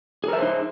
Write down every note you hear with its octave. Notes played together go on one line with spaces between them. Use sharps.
D#4 G#4 A#4 C5 E5